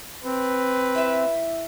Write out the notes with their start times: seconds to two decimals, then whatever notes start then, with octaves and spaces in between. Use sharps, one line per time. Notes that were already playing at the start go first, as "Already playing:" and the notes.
0.24 C4 B4
0.95 E4 E5